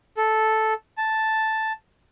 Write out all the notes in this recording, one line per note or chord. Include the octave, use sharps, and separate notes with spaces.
A4
A5